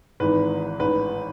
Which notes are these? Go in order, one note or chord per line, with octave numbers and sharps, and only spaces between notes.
G#1 G#2 E3 B4
A1 G#2 E3 B4